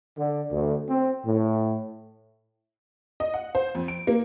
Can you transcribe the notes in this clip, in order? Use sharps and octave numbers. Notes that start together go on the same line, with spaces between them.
D3
D2
C4
A2
D#5
F#5
C5
F2
D7
A#3